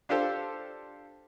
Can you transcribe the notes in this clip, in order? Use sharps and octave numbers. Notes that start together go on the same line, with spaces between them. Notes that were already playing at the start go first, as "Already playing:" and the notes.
D4 F4 G4 A4 C5